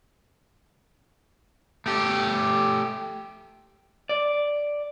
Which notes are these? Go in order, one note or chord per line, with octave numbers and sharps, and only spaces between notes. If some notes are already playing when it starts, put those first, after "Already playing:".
A3 G4
D5